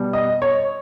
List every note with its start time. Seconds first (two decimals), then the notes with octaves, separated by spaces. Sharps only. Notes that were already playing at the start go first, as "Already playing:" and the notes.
Already playing: B2 G3
0.13 D#5
0.42 C#5